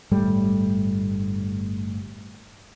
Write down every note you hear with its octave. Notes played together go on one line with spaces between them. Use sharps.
G1 A2 G3 A3